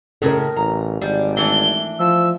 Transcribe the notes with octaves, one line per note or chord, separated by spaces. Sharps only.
A2 C#3 A4 A#4
A1 A#5
G#1 G3
E3 A3 D4 G7
F3 E6